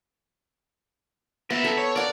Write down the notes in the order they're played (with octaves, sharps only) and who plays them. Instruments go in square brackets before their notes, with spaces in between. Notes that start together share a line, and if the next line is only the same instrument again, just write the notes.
[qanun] B3 [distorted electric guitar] A#4 E5
[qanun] A4
[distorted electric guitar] C#5
[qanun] A#4 F#5 [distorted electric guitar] D5